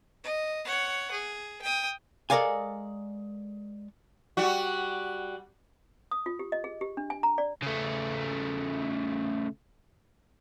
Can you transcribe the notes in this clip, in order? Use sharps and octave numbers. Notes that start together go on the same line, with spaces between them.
D#5
C#5 F#5
G#4
G5 D#6
G#3 A4 A#4 D5 F5 G#5
G3 F#4
D#6
F4
G4
D#5
G#4
G4
D4
G#5
A#5
D5
C#3 A3